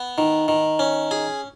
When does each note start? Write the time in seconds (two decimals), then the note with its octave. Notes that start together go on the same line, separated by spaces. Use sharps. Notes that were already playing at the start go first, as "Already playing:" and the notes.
Already playing: B3
0.18 D#3
0.48 D#3
0.79 C#4
1.11 G#4